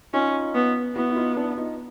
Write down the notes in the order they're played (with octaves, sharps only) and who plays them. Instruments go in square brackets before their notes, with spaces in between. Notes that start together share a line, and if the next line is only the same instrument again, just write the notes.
[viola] C#4 [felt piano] D#4 F4
[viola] B3
[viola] B3 [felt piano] E4 F#4
[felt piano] E4
D#4 F4
D4 E4
D#4 F4